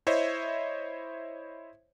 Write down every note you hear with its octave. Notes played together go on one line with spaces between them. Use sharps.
E4 C5 C#5 D#5 E5